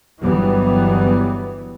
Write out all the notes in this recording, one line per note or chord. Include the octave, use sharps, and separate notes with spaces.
G1 E3 F#3 G3 B3